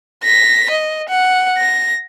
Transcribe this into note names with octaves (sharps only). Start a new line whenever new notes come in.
A#6 B6
D#5
F#5
A#6